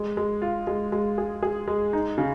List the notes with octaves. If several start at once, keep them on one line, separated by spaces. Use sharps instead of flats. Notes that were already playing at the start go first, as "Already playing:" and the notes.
Already playing: G#3
G#3
F4
G#3
G#3
G#4
G#4
G#3
D#4
C#3